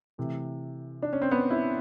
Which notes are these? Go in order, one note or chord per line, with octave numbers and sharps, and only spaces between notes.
C3 E3 A3
D4
C#4
C4
B3
E4